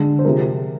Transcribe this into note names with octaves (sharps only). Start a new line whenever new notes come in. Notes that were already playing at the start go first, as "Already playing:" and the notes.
Already playing: D3 G#3
C5
C3 F3 G#3 A#4